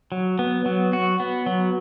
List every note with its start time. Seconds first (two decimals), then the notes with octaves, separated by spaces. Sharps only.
0.12 F#3
0.39 B3
0.66 F#3
0.93 F#4
1.20 B3
1.46 F#3